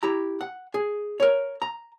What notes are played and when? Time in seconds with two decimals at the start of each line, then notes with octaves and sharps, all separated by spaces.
0.03 E4 G4 A#5
0.41 F#5
0.74 G#4
1.20 A#4 C#5
1.62 A#5